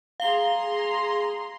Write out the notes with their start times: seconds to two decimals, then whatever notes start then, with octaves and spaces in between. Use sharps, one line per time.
0.20 G#4 F5 A#5 C6 G7